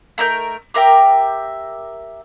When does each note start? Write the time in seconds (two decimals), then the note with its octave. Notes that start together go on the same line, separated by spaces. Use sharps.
0.18 A3 D#4 A#4 G6
0.74 G4 A#4 E5 G5